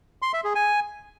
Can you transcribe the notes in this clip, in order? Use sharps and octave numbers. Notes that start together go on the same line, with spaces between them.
C6
E5
G#4
G#5